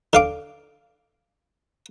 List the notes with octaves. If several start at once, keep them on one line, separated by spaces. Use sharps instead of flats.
D3 F5 D6